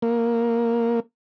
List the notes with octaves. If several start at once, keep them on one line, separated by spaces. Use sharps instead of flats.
A#3